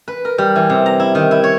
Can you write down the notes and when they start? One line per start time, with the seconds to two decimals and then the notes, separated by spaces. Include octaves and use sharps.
0.08 B4
0.25 A#4
0.38 G3
0.56 E3
0.70 C3
0.86 A#5
1.00 E4
1.15 D#3
1.31 E4
1.44 C#5